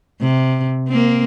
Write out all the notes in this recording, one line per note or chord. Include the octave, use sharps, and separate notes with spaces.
C3
A#3 C4